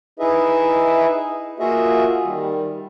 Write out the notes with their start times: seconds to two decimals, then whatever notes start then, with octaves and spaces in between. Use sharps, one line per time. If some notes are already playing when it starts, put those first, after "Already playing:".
0.19 D#4 E4 G#4 B4 D#5 E5
1.59 A#3 F4 F#4 G#4 D#5 E5
2.24 D#3 G3